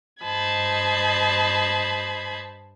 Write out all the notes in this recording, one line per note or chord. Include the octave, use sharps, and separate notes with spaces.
G2 C5 D#5 A5 B5 G#6